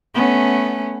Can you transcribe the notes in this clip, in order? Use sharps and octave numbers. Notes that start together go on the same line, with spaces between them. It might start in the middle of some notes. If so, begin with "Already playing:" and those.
A3 B3 C#4